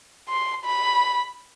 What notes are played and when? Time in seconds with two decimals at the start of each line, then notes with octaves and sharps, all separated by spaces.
0.29 C6
0.64 B5